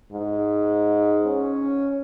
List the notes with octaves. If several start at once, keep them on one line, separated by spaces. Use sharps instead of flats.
G#2
C#4